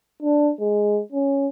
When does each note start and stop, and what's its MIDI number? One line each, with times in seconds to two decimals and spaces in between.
0.22 0.52 62
0.60 1.00 56
1.12 1.47 61